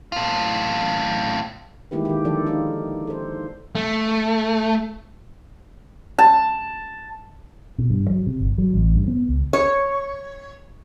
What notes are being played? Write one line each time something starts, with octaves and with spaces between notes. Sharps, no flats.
A2 F4
D#3 G#3 A#3 E4 G4 B4
D#3 G4
D3 D#3 F3 A4 D5
D#4 F4 G4
A4 C5
A3
A5
B2
G2
F#3
C3
G1
F#3
A1
G2
B3
C#2
C#5